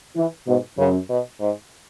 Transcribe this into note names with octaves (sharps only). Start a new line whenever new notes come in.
E3
G#2 B2
F#2 C#3
B2
G#2